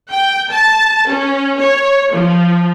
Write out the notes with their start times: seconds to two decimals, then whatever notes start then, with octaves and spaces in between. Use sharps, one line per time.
0.13 G5
0.51 A5
1.10 C#4
1.60 C#5
2.15 F3